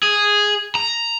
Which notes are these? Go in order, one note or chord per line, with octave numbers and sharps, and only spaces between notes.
G#4
A#5